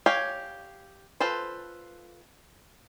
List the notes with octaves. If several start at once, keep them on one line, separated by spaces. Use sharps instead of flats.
G4 C#5 F5 G#5
F4 A4 B4 C5